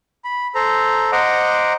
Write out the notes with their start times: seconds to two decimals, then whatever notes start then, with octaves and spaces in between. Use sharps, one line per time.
0.24 B5
0.55 A4 C5 A#5
1.12 C5 D#5 F#5 A#5 D6